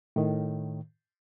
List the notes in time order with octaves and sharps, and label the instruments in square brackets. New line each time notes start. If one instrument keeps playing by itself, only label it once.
[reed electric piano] A2 D#3